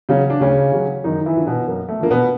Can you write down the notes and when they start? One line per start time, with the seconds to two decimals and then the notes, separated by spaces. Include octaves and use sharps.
0.09 C#3 F#3 C#4
0.30 D4
0.41 D2 C#3 C#4
0.72 C#3 F#3
1.04 F#2 D#3 D#4
1.26 E3 E4
1.37 D3 F3
1.46 B2 B3
1.67 F#2 A#3
1.89 A3
2.00 D3 F3 A#3
2.11 B2 B3